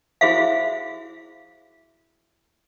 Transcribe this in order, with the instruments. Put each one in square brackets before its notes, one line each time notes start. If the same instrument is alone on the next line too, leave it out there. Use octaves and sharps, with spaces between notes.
[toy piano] E4 F#4 G#4 C5 E5 F5